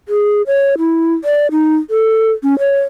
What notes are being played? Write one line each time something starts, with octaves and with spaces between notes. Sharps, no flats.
G#4
C#5
E4
D5
D#4
A4
C#4
C#5